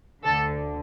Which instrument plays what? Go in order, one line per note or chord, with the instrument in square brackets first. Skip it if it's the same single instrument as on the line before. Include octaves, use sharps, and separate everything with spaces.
[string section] D2 D3 A4